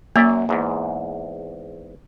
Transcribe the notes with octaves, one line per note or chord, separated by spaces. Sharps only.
F#2 A#3 D5 E5
E2 G#2